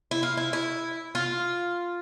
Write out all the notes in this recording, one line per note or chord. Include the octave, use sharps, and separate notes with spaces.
E4
F4
E4
E4
F4